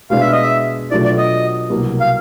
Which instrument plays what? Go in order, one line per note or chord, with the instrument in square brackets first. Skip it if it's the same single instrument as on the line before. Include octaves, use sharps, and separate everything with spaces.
[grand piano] B2 G#3 B3 D4 [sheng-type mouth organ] F5
[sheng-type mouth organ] E5
D#5
E5
[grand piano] B2 F#3 A3 D4 F4 [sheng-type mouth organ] D5
[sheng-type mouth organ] D5
D#5
[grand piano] C2 B2 F#3 A#3
[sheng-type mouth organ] F5